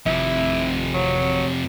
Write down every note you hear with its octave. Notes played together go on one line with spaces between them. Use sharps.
G#1 F2 C3 E4
F#3